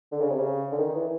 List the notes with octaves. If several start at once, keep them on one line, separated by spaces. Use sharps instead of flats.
D3
C#3
C3
C#3
D3
D#3
E3